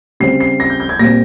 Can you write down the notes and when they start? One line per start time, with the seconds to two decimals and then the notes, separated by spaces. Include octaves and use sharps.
0.20 C#3 G3 C4 C7
0.40 C7
0.60 A#6
0.70 G6
0.80 G6
0.89 G#6
0.99 A#2 G3 C4 A#6